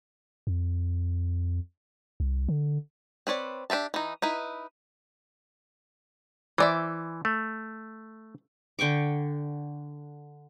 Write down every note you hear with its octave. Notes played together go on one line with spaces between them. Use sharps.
F2
C2
D3
C4 B4 C#5 D5
D4 G4 E5 A5
E3 D#4
D#4 E4 B4
E3 C5 D5 E5
A3
D3 G5 C#6 D6